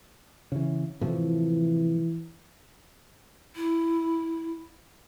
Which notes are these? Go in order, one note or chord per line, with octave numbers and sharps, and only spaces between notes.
C#3 E3
A2 C3 E3 F3
E4